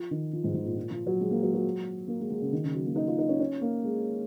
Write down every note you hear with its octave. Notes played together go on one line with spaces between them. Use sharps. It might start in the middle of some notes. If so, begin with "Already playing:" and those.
Already playing: F3
D#3
F3
G#2
G#2
A#2
A#2
F3
F#3
G#3
A#3
F#3
F#3
A#3
G#3
G#3
C#3
D#3
C#3
F#3
A#3
D#4
F4
D#4
C#4
C#4
A#3
G#3